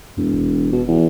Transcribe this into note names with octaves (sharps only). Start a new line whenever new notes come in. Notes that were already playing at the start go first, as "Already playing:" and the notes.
E1 F2
F#1
B2
E2